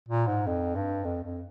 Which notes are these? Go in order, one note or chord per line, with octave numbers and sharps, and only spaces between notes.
A#2
G#2
F2
G2
F2
F2